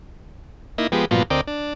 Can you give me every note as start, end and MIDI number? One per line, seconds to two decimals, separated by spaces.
0.78 0.87 58
0.78 0.87 63
0.78 0.87 64
0.92 1.05 53
0.92 1.05 56
0.92 1.05 59
0.92 1.05 67
1.11 1.23 43
1.11 1.23 46
1.11 1.23 53
1.11 1.23 54
1.11 1.23 59
1.11 1.23 65
1.30 1.41 38
1.30 1.41 60
1.30 1.41 70
1.30 1.41 74
1.30 1.41 75
1.30 1.41 79
1.47 1.73 62